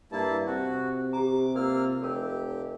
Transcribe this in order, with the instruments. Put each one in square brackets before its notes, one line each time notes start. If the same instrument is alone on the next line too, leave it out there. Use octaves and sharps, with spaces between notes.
[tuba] G2 [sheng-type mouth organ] A#3 E4 A5
[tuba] C3 [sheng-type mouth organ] F#4
[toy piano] G4 A#5 [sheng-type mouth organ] D6
[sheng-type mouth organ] A#3 F4 F6 [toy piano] A#4 D5 E6
[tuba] F1 [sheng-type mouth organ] G4 [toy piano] A4 A#4